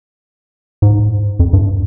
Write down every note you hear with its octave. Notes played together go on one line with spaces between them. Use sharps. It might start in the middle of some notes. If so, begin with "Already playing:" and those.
G#2
F2
G2